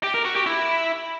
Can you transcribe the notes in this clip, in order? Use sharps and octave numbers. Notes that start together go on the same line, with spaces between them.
G4
A#4
F#4
G4
E4